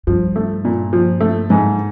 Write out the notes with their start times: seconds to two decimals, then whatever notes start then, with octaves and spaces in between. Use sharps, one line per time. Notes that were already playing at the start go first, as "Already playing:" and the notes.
0.07 G2 F3
0.36 A3
0.65 A#2
0.93 F3
1.20 A3
1.50 G#2